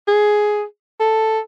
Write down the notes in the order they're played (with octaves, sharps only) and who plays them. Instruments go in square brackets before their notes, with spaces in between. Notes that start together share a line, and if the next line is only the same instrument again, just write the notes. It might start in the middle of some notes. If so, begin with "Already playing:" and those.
[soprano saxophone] G#4
A4